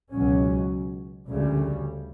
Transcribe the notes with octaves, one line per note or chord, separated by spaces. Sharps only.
C#2 B2 F#3 C#4
D2 C#3 G3